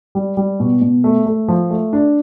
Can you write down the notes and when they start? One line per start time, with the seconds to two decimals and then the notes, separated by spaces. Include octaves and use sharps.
0.15 G3
0.37 G3
0.60 B2
0.82 B2
1.04 A3
1.26 A3
1.48 F3
1.70 A3
1.93 D4